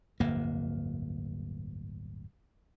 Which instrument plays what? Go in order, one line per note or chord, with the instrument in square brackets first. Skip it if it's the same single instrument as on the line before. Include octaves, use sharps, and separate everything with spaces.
[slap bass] D1 G1 F2 A#3